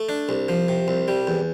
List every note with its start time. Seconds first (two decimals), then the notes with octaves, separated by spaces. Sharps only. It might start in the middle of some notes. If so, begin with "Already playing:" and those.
Already playing: A3
0.09 D4
0.29 C2
0.49 F3
0.68 C3
0.88 C2
1.08 G3
1.27 E2